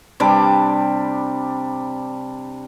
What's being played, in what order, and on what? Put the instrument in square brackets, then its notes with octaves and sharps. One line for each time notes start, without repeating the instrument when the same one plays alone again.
[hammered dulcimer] C3 G3 D4 D6